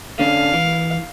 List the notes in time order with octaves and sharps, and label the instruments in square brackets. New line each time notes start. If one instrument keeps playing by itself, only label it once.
[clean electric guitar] D3 C#4 D4 [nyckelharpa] F5
[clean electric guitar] E3